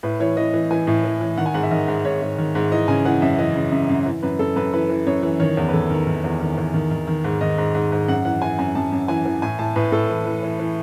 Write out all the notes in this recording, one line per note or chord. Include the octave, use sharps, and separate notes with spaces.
A2 B4
E3 C#5
E3 D#5
E3
E3 G#5
A2
E3
E3
D#3 F#5
G#5
G#2 F#5
E5
D#3 D#5
G#2
G#2 C#5
G#2
D#3
G#2
E3 D#5
C#3 G#5
E3 F#5
F#2 E5
E3 D#5
C#3
F#2 E5
F#2
E3
F#2 B4
F#2 A4
F#2 B4
E3 B4
E3
F#2 C#5
E3
D#3 C#5
E2
B4
D#3 A4
D#3
D#3
E2
D#3
E2
D#3
D#3
D#3
G#2
D#3 D#5
G#2
G#2
G#2
F#2 F#5
E3 F#5
E3 G#5
F#2 G#5
F#2 A5
F#2
E3 G#5
E3
A2 G#5
A2 A5
A2 B4
A2 A4
E3
E3
E3
E3